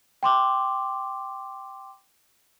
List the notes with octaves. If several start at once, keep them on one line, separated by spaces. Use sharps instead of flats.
G5 C6 D6